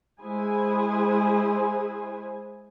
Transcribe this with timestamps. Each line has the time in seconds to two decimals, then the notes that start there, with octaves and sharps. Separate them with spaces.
0.21 G#3 E4 G#4 C5 G#5